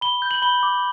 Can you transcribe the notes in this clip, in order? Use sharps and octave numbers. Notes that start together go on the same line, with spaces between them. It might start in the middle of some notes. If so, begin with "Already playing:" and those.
B5 G7
G6
F#7
B5 G7
D6